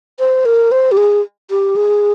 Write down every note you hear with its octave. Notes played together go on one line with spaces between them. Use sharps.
C5
A#4
C5
G4
G#4
G4
G#4